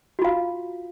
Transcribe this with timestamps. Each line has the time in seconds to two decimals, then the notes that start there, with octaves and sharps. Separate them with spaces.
0.19 F#4
0.22 F4
0.25 F5